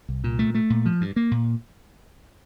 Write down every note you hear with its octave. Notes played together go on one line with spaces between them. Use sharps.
C2
A#2
A3
A3
A#2
F3
G2
A#3
A#2